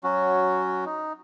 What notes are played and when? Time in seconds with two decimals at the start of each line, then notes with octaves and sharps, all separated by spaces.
0.04 F#3 C#4 F#4
0.86 D#4